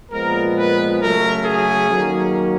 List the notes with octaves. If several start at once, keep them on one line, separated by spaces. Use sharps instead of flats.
A#2 F3 G#3 B3 A#4
B4
C#3 F#3 A3 C#4 A#4
G#4
D#3 F#3 A#3 C#4